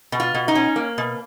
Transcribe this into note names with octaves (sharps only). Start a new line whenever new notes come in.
B2
F4
B2
D#4
C#4
A#3
B2